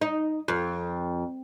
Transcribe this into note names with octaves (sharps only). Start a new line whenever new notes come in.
D#4
F2